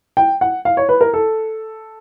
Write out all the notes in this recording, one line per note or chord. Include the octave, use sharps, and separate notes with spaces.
G5
F#5
F5
C#5
B4
A#4
A4